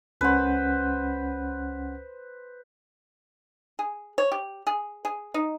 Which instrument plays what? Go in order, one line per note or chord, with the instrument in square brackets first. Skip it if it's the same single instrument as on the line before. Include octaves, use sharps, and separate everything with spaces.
[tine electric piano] C#2 C#4 F#5 [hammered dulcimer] B4 C5
[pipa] G#4
C#5
G4
G#4
G#4
D#4